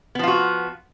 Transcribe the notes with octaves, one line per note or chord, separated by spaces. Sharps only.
F3 B3 F4 F#4